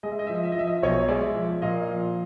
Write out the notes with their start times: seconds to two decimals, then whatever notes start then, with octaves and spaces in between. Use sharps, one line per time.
0.03 G#3 D#5
0.12 E5
0.19 D#5
0.27 F3 E5
0.35 D#5
0.44 E5
0.52 D#5
0.56 F3 E5
0.67 D#5
0.76 E5
0.82 B1 C#5 D#5
1.09 G#3 D5 E5
1.36 F3
1.62 A#2 D#5 F5
1.89 F3